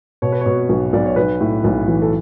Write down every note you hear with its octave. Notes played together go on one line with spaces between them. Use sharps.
B2 C#5
B4
C#5
B2
B1
B1 D5
C#5
B1 B4
A2
B1
E3
A4